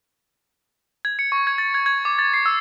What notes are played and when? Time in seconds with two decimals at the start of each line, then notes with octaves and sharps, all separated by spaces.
1.05 G#6
1.19 C#7
1.32 C#6
1.47 G#6
1.58 A6
1.74 G#6
1.86 G#6
2.05 D6
2.19 A6
2.34 C7
2.46 E6